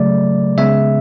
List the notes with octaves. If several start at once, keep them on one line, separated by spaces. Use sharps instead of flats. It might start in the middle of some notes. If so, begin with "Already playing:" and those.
Already playing: C#3 F#3 A3 D5
C#3 G#3 B3 E5